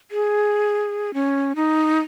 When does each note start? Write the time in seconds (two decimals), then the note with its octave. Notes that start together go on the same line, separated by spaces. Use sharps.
0.11 G#4
1.14 C#4
1.56 D#4